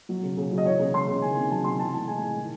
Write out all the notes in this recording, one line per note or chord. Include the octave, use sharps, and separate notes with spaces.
F#3
C#3
C#3
F#3
D#5
E3 C#5
C#3
G#3 C6
C#3
D#3 G#5
C3
F#3 A5
C3 C6
E3 A5
A2 A5
G#3 G#5
A2
D#3